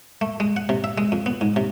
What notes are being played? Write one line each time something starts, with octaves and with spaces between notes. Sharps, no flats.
A3
G#3
F#5
C3
E5
G#3
F2
B3
G#2
C3